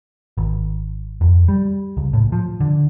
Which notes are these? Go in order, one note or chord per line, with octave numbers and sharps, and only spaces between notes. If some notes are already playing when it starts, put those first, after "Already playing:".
G#1
F2
G3
C#2
A2
F3
D3